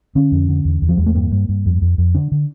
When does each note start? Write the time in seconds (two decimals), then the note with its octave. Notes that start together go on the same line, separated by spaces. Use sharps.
0.15 D3 C#4
0.32 F2
0.49 D3
0.65 E2
0.82 E2
0.89 F3
0.97 E2 G3
1.06 A3
1.15 G2 A#3
1.32 G2
1.49 G2
1.66 F2
1.82 F2
1.98 F2
2.15 D3 D4
2.32 D3